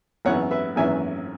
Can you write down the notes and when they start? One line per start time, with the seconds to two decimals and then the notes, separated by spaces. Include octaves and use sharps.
0.25 G#1 F#2 E3 B3 C#5 F#5
0.51 B4 E5
0.76 G#1 F#2 E3 B3 E5 G#5